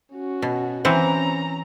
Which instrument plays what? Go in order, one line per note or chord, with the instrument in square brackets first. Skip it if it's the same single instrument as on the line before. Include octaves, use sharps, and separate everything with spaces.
[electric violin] C#4 F#4
[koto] B2
[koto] E3 C4 F#5 [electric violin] C#4 A#5